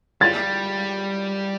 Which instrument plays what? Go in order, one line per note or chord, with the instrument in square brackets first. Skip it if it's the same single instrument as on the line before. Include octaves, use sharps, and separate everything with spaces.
[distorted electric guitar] G3 [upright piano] A6